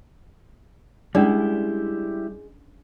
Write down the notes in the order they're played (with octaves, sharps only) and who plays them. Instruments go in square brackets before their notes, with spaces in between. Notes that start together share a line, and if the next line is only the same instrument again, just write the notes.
[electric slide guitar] G3 E4 G4 [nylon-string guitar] G#3 [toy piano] C#4 D4 D5